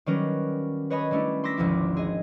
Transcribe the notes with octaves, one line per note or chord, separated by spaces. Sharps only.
D#3 F#3 G3 C#4 A#4 B4
B4 C#5 D#5 G#5 B5 D#6
G3 A3 C#4 D4 E4
C6 D6 E6 A#6 B6
G#1 D2 F3 E4 D6
G#4 D#5